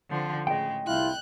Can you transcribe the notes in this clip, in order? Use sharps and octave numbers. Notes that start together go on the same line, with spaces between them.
D3 F3 C4
A2 C#3 G#3 D#5 G5
C2 E4 F4 F#6 G6